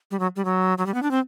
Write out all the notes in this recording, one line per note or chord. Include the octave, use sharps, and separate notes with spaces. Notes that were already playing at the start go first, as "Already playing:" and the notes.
G3
F#3
G3
F#3
F#3
G3
B3
D4
C4